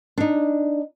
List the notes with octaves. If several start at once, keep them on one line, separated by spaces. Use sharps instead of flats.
D4 D#4